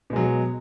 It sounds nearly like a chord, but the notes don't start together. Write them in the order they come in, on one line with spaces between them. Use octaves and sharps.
B2 G#3 F#3